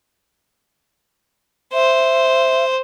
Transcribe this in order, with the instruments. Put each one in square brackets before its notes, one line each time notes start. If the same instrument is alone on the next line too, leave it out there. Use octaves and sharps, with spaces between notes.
[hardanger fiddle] C5 [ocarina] E5